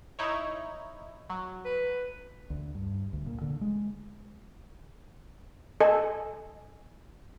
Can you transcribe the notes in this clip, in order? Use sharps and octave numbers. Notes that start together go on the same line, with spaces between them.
D#4 E4 C#5
F#3
B4
D2
G2
D2
A#2
D3
G#3
A4 D#5 G#5